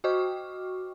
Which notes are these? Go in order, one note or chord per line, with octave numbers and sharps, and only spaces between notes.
F#4 D#5 G5 C#6 D6 F6